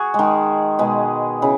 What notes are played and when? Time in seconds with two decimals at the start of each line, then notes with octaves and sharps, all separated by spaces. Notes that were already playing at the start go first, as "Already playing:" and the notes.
Already playing: F#4 G#4
0.14 D#3 G#3
0.79 B2 G#3
1.42 C#3 E4